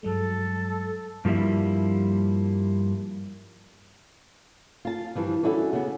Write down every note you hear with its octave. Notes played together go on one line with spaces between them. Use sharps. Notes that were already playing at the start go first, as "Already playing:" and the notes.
G2 F#3 G#3 A4
G2 F3 G3 A#3 E4
F4 A5
G2 E3 F3
C#4 D4 E4 F#4 G4 A4
C#3 B3